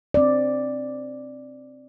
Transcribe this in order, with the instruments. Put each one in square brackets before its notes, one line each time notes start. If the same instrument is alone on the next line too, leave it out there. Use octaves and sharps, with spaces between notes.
[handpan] C4 D5